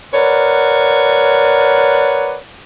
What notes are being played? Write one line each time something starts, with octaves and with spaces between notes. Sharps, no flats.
A#4 B4 C#5 D5 F#5